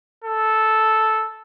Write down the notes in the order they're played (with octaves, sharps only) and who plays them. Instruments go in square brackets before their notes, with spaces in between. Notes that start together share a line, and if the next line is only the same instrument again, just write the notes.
[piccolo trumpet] A4